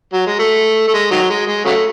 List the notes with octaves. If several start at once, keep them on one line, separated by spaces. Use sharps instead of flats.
F#3
G#3
A3
A3
G#3
D#3 F#3
G#3
G#3
C#3 F#3 A3